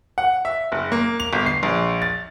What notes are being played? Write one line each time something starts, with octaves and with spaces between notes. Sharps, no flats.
F#5
E5
F#1
A#3
F7
G1
C7
A#1
A6